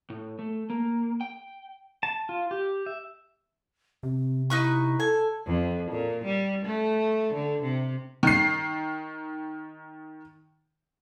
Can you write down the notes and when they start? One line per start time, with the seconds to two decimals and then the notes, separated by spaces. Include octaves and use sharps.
0.10 A2
0.39 A3
0.70 A#3
1.21 G5
2.03 A5
2.29 F4
2.51 G4
2.86 E5
4.03 C3 C4
4.50 D#4 E4 B4 C#6
5.00 A4 G#5
5.46 F2
5.91 A#2
6.25 G3
6.65 A3
7.33 D3
7.63 C3
8.23 D#3 C7